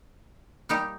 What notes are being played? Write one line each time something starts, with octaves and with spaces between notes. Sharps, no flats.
G3 A#3 D#4 G4